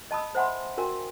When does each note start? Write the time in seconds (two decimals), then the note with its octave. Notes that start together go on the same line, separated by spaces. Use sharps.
0.11 D#5 A5 B5 D#6 E6
0.35 C5 E5 F#5 G#5 B5 C6
0.77 F#4 A#4 G5 G#5